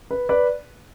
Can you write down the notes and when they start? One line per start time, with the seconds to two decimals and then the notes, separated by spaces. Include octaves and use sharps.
0.11 B4
0.29 B4 D5